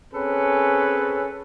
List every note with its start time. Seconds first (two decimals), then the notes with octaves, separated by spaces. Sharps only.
0.13 C4 C#4 G#4 A4 B4 C#5